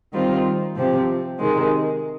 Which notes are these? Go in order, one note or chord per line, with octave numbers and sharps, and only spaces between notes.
D#3 G3 C4 F4
C3 F3 C4 G4
C3 D#3 G#3